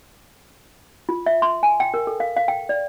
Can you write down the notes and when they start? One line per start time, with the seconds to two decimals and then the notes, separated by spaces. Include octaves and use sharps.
1.09 F4
1.26 E5
1.42 C6
1.63 G#5
1.80 G5
1.94 A#4
2.07 A4
2.20 F5
2.36 F5
2.48 G5
2.69 D5